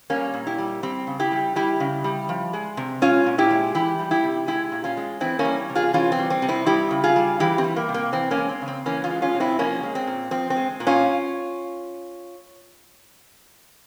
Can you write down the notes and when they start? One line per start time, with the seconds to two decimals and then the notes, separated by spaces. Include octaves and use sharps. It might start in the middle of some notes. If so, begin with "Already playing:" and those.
0.10 G3 A#3 C#4
0.34 A#2
0.47 E4 G4
0.58 G3
0.83 G3 C4
1.07 C#3
1.19 E4 G4
1.32 G3
1.56 G3 E4 G4
1.80 C#3
2.04 G3
2.29 F3
2.53 G#3
2.77 C3
3.02 G#3 C#4 F4
3.26 A#2
3.38 E4 G4
3.51 G#3
3.75 E3 E4 G4
3.99 G3
4.11 E4 G4
4.23 C3
4.47 G#3 E4 G4
4.72 A#2
4.84 C#4 F4
4.97 G#3
5.20 E3 C4 E4
5.39 A#3 C#4
5.45 G3
5.69 C3
5.75 F4 G#4
5.93 E3 C#4 F4
6.12 C4
6.19 G3
6.30 C4
6.42 C3
6.48 C4 E4
6.66 G3 E4 G4
6.91 C#3
7.04 F4 G#4
7.16 G3
7.40 E3 E4 G4
7.58 C4
7.64 G3
7.76 A#3
7.89 C3
7.94 A#3
8.12 E3 C4
8.31 A#3 C#4
8.37 G#3
8.49 C4
8.62 C#3
8.68 C4
8.86 E3 A#3 C#4
9.04 C#4 F4
9.10 G#3
9.22 C#4 F4
9.35 C3
9.40 C4 E4
9.59 F3 A#3 C#4
9.83 G#3
9.95 C4
10.07 A#2
10.31 F3 C4
10.50 C4
10.56 G#3
10.80 A#2
10.87 C#4 F4